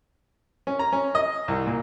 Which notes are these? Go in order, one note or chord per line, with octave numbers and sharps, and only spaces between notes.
C#4
A#5
C#4
D#5
C2
A#2